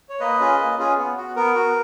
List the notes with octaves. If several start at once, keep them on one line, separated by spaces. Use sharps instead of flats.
C#5
A#3 B4 D#5
C#4 F4 G#4
A#3
C#4 F4 G#4
B3
F#4
B3 A#4
F#4